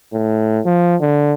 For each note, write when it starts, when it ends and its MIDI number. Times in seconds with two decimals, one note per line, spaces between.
0.13 0.60 45
0.66 0.96 53
1.01 1.34 50